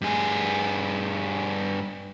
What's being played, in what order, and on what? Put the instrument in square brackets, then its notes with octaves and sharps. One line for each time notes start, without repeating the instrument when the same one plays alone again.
[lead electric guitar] G2 G#4